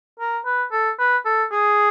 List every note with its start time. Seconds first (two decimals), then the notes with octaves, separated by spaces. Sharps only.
0.20 A#4
0.45 B4
0.72 A4
0.99 B4
1.25 A4
1.52 G#4